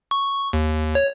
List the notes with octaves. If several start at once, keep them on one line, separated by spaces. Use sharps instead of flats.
C#6
D#2
C#5